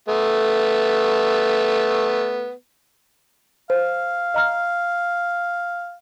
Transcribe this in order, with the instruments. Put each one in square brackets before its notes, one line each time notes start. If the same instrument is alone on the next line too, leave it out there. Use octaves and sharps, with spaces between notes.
[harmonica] A3 B3
[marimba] C5 [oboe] F5
[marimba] D#5 A#5 F6